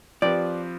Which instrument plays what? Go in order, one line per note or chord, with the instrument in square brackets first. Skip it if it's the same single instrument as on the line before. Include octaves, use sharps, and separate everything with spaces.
[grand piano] F3 C4 G4 B4 [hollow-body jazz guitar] D5